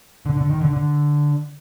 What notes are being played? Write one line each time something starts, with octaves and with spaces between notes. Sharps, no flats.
D3
D3
D#3
D3
D3